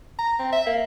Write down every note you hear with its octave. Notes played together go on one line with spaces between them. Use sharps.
A#5
C4
E5
A#3